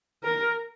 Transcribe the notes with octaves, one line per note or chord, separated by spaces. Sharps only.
A#4